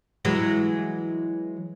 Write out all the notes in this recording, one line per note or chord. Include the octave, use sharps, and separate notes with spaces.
E3 F#3 G#3